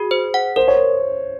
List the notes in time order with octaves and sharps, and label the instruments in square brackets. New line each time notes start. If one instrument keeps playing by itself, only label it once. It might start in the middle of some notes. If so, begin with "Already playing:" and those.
Already playing: [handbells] F#4 [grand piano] G#4
[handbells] C5
F#5
[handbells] A#4 [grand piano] C5
[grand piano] C#5